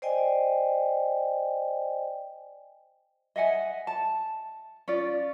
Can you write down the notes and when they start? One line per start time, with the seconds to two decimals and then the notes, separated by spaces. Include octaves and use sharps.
0.02 C5 D5 D#5 G5 G#5
3.36 D#5 E5 F#5 G#5
3.87 A5
4.88 C#4 F4 D5